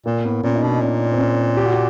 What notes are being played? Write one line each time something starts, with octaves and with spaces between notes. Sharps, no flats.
A#2 A#3
A2 B3
A#2 C#4
D#4
B2 D4
A#2 C#4
C4
C#4
G4
F#4
G4